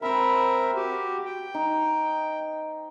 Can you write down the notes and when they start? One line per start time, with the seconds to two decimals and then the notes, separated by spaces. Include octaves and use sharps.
0.02 C4 A#4 C5 E5 B5
0.75 F#4 G4
1.25 G5
1.54 D#4